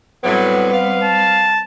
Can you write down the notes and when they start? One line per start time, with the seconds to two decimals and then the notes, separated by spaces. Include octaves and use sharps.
0.23 A2 F#3 G3 B3 C4 B4
0.72 F5
1.03 A5